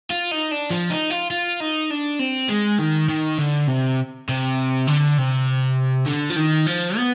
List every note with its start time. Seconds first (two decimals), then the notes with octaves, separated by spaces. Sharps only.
0.10 F4
0.31 D#4
0.51 D4
0.70 F3
0.90 D#4
1.10 F4
1.30 F4
1.60 D#4
1.90 D4
2.19 C4
2.49 G#3
2.79 D#3
3.10 D#3
3.39 D3
3.68 C3
4.29 C3
4.87 D3
5.18 C3
6.06 D3
6.30 F3
6.37 D#3
6.67 F3
6.97 B3